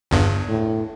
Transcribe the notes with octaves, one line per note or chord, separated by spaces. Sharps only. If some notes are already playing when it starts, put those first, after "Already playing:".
G1 E2 G2
A2